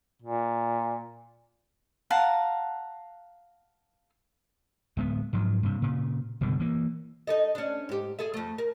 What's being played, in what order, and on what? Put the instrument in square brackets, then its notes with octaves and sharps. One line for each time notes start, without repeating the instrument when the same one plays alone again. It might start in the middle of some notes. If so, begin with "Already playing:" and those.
[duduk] A#2
[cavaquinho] F5 F#5 A5 A#5
[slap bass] D1 G#3 B3
G#2 F3 F#3
G2 C3
A#2 C#3
F#1 B2 D3 G3
E3 A#3
[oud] D#4 A4 D#5
C#4 D4
G#2 G4
G#4 A4 E5
F2 A3
A#4